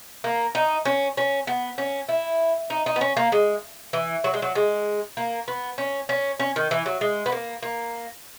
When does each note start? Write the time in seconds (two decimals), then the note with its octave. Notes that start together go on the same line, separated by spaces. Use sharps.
0.24 A#3
0.55 D#4
0.85 C#4
1.17 C#4
1.47 B3
1.78 C#4
2.09 E4
2.70 D#4
2.86 D#4
2.96 B3
3.01 C#4
3.17 A#3
3.32 G#3
3.93 E3
4.24 F#3
4.34 G#3
4.42 F#3
4.55 G#3
5.17 A#3
5.48 B3
5.78 C#4
6.09 C#4
6.40 C#4
6.56 D#3
6.71 E3
6.86 F#3
7.01 G#3
7.26 B3
7.32 A#3
7.63 A#3